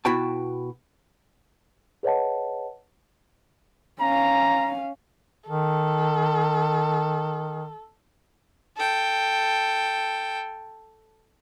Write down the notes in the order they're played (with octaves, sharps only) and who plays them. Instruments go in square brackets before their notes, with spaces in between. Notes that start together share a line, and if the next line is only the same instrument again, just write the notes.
[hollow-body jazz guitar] B2 E4 F#4 G5 A5
[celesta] G#4 B4 C#5 D#5 F#5 A5
[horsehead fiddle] C#4 F5 [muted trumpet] A#5
[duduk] D#3 [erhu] A4
[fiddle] A4 G5